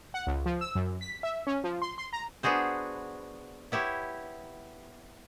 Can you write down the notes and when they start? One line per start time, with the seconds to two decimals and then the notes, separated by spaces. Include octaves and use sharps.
0.14 F#5
0.27 C#2
0.46 F3
0.61 E6
0.75 F#2
1.01 B6
1.23 E5
1.47 C#4
1.64 F3
1.82 C6
1.98 C6
2.13 A#5
2.43 B3 D4 F#4 G#4 C5
3.72 B3 E4 G4 C#5